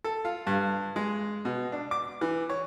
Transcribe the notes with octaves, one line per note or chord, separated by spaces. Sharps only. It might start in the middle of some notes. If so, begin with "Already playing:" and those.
A4
F4
G2
G#3
B2
D4
D6
E3
C#5